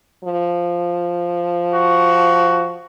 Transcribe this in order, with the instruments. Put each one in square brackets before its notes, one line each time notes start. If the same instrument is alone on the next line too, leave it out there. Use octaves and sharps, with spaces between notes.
[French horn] F3
[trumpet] F#4